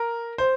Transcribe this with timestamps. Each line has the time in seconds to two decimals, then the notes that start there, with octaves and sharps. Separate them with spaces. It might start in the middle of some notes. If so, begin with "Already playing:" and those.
Already playing: A#4
0.38 C5